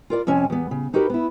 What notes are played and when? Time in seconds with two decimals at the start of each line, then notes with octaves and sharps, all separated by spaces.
0.10 F4 A#4 D5
0.27 F2 C3 C#4 G#5 A5
0.50 E2 B3
0.71 C#3
0.94 D#4 F#4 G4 A#4 B4
1.10 B3 E4